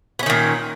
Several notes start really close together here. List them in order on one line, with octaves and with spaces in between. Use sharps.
B3 C#4 D#3 A#2